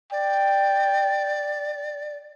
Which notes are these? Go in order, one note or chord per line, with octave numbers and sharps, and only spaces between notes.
D5 G5